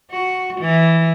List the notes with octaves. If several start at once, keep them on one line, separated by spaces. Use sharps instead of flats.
F#4
E3